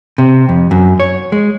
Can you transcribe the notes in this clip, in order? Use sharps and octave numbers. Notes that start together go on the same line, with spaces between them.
C3
F2
F#2
C#5
G#3